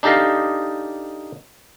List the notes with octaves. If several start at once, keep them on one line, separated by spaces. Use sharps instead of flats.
D4 D#4 G4 A4 D#5 F5